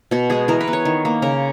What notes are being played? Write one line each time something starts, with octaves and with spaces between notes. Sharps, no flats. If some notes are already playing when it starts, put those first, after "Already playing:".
B2 F#4
G#3 B3 G#4
E3 A#4
B4
B3
C#5
D#3
A#3
C#3 A#4